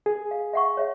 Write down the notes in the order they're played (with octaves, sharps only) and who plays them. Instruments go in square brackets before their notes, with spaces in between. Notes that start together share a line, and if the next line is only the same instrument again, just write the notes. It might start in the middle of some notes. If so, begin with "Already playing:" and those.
[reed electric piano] G#4
[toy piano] F5
E5 F#5 C#6
C#5 E5